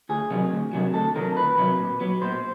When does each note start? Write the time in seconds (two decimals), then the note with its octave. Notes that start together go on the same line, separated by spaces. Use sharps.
0.09 D2 G#4
0.31 C3 D#3 F#3
0.52 D2
0.73 C3 D#3 F#3
0.94 D2 A4
1.16 C3 D#3 F#3 A#4
1.36 D2 B4
1.58 C3 D#3 F#3
1.79 A#2
2.01 F#3 B3
2.22 A#2 C5